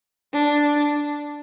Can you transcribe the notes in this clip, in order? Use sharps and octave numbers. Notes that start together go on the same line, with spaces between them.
D4